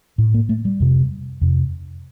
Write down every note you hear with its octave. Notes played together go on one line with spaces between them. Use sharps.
A2
A#3
A3
G3
F2 C3
F2 C3